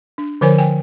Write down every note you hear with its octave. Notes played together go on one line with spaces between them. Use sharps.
D4
D3 F3 A#4 C5 C#5 G#5
G5 G#5